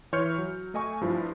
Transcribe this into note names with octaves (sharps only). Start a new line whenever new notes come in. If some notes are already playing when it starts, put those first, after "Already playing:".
E3 C#5 C6 F6 G6 C#7
F#3
A3 D#5 G#5 C#6
G2 F3 E4 F4